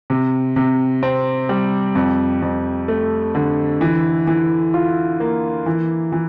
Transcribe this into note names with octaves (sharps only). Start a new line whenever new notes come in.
C3
C3
C4
G3
F2
F2
A3
D3
E3
E3
F4
A#3
E3
E3